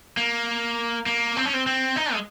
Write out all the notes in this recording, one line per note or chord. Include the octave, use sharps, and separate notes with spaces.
A#3
A#3
C4
C#4
C4
C4
D#4
G#3